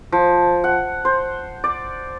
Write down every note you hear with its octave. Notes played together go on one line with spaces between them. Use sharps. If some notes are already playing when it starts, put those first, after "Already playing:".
F3
F#5
C5
D5